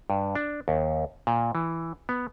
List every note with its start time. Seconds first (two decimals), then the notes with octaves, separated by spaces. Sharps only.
0.10 G2
0.35 D4
0.68 D#2
1.27 A#2
1.55 E3
2.09 B3